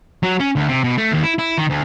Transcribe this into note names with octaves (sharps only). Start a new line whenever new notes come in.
F#3
C#4
D2
C3
B2
A3
D#2
E4
E4
D#3
D2